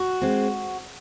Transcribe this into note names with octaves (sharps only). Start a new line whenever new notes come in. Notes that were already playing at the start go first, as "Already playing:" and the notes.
Already playing: F#4
G#3 C4